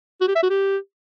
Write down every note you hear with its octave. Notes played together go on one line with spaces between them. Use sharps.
F#4
G4
E5
F#4
G4